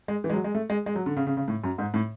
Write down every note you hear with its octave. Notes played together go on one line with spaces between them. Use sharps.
G#3
E3
G#3
F#3
G#3
A3
G#3
G#3
F#3
D3
C#3
C#3
C#3
A2
F#2
G#2
A2